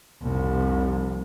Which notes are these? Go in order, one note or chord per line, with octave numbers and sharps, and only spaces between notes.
F1 C2